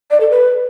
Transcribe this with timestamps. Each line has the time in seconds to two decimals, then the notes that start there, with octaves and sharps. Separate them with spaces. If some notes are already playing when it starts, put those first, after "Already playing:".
0.11 D5
0.20 A4
0.30 B4